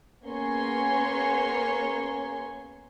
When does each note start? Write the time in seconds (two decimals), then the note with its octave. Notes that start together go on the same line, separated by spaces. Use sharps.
0.25 A#3 B3 C#4 G#4 C#5 C6